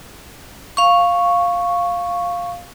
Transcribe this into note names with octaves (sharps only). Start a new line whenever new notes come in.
F5 C#6